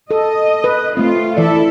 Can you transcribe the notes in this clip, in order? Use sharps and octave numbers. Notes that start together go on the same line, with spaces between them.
A4 D#5
B4
A3 C4 F4
E3 E4 A4 D5